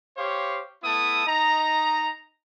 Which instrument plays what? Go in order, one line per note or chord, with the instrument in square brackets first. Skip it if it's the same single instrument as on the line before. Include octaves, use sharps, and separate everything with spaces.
[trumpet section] G4 C5 C#5 F5
A3 B3 E4 A5 D#6
D#4 D#5 A#5